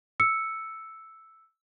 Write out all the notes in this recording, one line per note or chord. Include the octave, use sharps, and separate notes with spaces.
E6 C#7